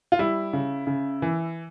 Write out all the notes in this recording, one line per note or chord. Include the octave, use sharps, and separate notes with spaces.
F4
G3 E4
C#3
C#3
E3